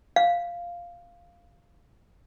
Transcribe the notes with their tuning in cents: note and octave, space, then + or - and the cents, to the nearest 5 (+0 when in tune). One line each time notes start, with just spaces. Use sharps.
F5 -5